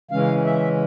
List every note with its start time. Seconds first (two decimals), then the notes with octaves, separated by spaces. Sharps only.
0.11 C#3 E3 G#3 C#4 F5
0.45 E5